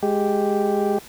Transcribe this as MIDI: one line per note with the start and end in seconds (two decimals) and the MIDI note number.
0.03 0.98 56
0.03 0.98 67